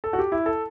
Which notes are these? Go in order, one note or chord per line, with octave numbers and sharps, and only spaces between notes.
A4
F#4
G4
E4
A4